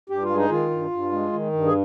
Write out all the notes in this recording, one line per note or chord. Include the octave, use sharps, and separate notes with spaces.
G2 G4
F4
G#3
D#4
D#3 F4
G2
G2
G#3
D#3
G2
G#4